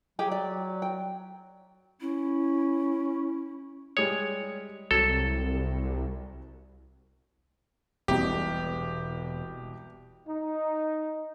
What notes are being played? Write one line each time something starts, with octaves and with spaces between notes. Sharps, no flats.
F#3 G4 G#4 G5
D5
G5
C#4 E4
G3 G#3 C#5 D#6
C2 F#3 A4 G#6 E7
E1 C2 B2 G4
D#4